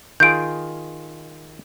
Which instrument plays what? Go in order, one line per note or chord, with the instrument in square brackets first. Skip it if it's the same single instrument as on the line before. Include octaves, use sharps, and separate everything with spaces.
[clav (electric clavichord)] D#3 F4 G#4 [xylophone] G6 D7